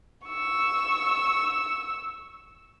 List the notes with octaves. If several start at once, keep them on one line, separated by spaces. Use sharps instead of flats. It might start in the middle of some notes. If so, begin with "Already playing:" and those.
C#6 E6